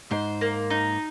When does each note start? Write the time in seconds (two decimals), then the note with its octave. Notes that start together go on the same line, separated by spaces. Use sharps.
0.11 G#2 C5
0.41 A#3
0.70 D#4